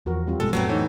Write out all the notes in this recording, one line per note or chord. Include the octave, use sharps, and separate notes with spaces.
E2 F3 F#4 A#4
G3 C4 F4
G1 B2 G#3 A4
F2 A2 F#3 A3 B3 C4 B4
E3 D#4 C#5